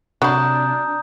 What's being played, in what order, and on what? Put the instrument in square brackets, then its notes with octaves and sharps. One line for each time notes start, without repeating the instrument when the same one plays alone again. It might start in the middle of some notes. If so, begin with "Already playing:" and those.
[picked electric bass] C3 [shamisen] F#3 B5 [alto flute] D4 [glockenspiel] A#5 D#6 G6